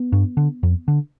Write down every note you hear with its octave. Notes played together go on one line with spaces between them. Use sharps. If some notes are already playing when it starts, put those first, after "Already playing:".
Already playing: B3
G2
D3
F2
D3